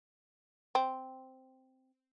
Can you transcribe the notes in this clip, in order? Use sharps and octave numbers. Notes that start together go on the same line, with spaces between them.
C4